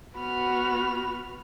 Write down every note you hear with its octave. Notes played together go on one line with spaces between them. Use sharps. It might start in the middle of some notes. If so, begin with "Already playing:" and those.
B3 F#4 B5 F6